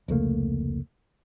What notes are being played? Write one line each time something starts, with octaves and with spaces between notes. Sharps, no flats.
F1 C#2 A3 A#3